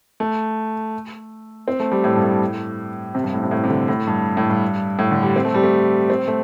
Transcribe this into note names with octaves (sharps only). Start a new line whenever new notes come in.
A3
C4
A3
G3
A2
G2
A2
C3
G2
A2
C3
A2
C3
D3
A2
G2
A2
G2
A2
D3
G3
C4
A3
G3
A3
C4
A3